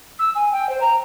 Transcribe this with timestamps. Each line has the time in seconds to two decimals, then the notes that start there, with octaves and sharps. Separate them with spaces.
0.19 E6
0.35 G#5
0.52 G5
0.69 C5
0.81 A#5